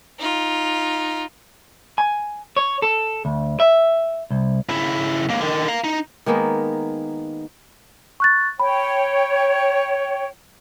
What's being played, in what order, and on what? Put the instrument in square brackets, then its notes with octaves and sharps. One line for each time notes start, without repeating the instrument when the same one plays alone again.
[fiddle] D#4 F4
[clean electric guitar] G#5
C#5
A4
D2
E5
C2
[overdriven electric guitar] C#3 E4
C#2 A#3
D3 D#3
F5 A#5
D#4
[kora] D#3 G#3 A#3 B3
[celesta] C#6 F#6 A6
[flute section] C#5 G5 [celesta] B5